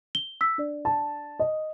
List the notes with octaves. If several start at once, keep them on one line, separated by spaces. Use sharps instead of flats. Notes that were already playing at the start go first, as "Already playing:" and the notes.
G7
E6 B6
D4 D5
A5
D#5